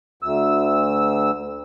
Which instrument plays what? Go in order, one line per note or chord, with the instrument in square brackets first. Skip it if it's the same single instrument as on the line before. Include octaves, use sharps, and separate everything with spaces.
[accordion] D2 E6